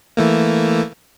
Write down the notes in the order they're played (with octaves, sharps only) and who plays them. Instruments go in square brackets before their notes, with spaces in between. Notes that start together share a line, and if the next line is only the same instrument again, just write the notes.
[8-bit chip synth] E3 A3 A#3